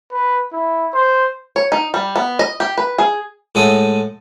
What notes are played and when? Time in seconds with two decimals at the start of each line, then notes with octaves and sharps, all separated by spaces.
0.12 B4
0.52 E4
0.94 C5
1.56 C#5
1.72 D#4
1.94 G3
2.16 B3
2.39 D#5
2.60 G4
2.78 B4
2.98 G#4
3.55 A2 G#3 A4 F#5 D#6